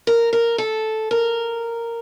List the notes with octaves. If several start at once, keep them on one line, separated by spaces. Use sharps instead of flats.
A#4
A#4
A4
A#4